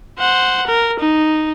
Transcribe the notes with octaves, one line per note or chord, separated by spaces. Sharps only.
C5 F#5
A#4
D#4